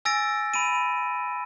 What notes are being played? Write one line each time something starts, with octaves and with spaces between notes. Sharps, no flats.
G#5 E6 A6 A#6 D7
B5 D7 D#7